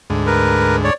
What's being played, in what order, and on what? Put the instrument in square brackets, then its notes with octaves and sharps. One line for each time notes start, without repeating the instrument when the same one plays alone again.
[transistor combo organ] D2 G#2
[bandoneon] A#4 B4
C#5 D5